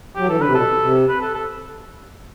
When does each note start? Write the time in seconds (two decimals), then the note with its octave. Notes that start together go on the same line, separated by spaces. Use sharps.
0.15 F#3 G4
0.27 E3 A4
0.36 D3
0.42 B4
0.46 C3
0.55 B2 A4
0.82 C3
1.08 B4
1.21 A4
1.35 A4